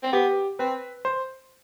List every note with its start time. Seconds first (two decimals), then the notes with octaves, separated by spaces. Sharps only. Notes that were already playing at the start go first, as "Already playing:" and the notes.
0.03 C4
0.12 B3 G4
0.59 C4 B4
1.05 C5